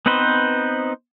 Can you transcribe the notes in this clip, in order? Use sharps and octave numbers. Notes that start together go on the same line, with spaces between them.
B3 C4 D#4 B4 C5